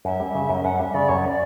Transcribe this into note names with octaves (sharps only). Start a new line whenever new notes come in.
F#2 E5
G3
C#3
F#2
F#2 F#5
G3 E5
C#3 D5
F#2 C#5
E5
D5